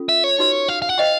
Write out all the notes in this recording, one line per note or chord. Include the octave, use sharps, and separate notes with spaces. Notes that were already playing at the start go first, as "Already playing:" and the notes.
Already playing: C#4 F4 A4
E5
C#5
D#4 F#4 B4
F5
F5
F#5
C5 D#5 F5 G5